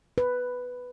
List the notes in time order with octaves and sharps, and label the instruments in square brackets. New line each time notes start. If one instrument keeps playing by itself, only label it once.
[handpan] B4